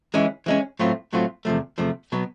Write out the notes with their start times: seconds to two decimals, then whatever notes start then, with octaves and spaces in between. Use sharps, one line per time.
0.14 E3 G#3 C#4
0.46 E3 G#3 C#4
0.79 A2 F#3 A3 C4 F4
1.13 A2 F#3 A3 C4 F4
1.45 E2 C3 F3 A3
1.78 E2 C3 F3 A3
2.12 B2 F#3 B3